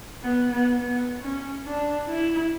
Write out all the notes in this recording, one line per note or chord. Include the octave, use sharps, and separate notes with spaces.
B3
B3
B3
C#4
D4
E4